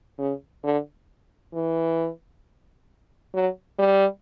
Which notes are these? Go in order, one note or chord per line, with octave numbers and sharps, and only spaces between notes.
C#3
D3
E3
F#3
G3